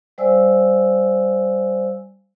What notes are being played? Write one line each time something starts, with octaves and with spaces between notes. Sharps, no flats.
G3 C5 D5 F5 G#5 E6